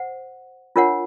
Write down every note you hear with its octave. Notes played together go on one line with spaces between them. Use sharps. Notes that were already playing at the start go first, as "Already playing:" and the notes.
Already playing: C5 F#5
D4 F4 A#4 C#5 F#5